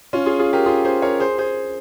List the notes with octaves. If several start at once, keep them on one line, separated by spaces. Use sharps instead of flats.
C#4 F4
F4 G#4
F4 G#4
G4 A#4
F4 G#4
G#4 C5
A#4 C#5
G#4 C5
G#4 C5